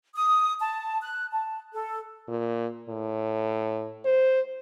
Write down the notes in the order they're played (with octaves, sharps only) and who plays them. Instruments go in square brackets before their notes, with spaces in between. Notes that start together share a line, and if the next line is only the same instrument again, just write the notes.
[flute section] D#6
A5
F#6
A5
A4
[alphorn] A#2
A2
C5